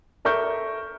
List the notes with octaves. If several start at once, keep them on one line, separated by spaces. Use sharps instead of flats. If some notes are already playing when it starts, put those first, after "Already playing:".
A4 A#4 E5 C#6 G6